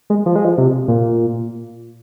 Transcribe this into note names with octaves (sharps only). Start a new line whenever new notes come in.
G#3
F3
G#3
F3
C3
A#2